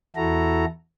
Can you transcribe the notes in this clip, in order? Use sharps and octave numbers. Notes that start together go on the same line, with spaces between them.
E2 E4 F#4 A4 A#5